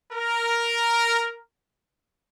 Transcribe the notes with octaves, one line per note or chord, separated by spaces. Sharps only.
A#4